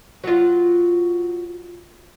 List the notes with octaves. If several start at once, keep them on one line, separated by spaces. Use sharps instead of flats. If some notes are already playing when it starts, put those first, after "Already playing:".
F#3 F4